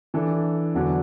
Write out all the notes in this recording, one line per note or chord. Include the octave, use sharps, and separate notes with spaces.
E3 D4 A4
E2 D3 F#3 D4